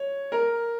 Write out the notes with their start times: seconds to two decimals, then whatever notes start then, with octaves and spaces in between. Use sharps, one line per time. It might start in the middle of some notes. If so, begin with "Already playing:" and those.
Already playing: C#5
0.32 A#4